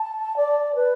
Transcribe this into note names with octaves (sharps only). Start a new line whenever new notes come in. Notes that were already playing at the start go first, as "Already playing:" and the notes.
Already playing: A5
D5
B4